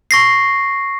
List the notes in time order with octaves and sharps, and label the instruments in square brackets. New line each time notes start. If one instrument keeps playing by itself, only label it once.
[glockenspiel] C#6 A#6 C7